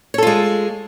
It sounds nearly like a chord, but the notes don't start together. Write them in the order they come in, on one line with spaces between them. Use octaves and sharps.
C#5 A4 F4 G#3